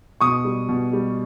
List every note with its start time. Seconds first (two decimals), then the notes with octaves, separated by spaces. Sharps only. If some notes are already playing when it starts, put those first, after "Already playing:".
0.21 B2 C#6 D#6
0.45 G3
0.69 B2
0.93 G3